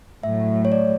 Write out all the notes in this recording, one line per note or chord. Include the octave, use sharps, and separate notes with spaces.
A2 F#3 A3 E5
C#5
D5